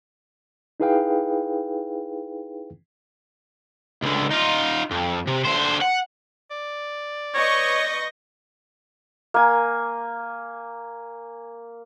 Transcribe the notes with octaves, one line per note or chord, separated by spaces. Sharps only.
D#4 E4 G#4 B4 F5 G5
C#2 D3
D#4 F4
F2
C3
D3 C5
F#5
D5
B4 C#5 D#5 C#6 G6 A#6
A#3 G#5